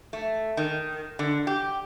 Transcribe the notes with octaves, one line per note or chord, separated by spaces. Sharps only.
A3
D#3
D3
G4